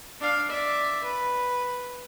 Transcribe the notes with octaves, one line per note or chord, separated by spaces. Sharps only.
D4 F5
D5 E5
B4